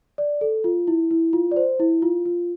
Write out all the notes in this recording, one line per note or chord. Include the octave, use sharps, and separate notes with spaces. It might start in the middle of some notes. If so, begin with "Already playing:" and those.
D5
A4
F4
E4
E4
F4
D5
C5
E4
F4
F4